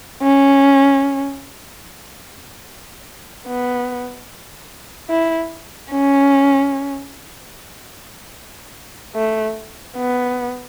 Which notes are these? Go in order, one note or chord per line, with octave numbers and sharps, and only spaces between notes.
C#4
B3
E4
C#4
A3
B3